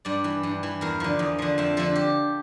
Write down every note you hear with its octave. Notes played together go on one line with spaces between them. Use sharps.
G2 D5
E3
G2
E3
E2 A#4
D3 F3
E2
D3 F3
F2 E5
D3 F3 A4
G4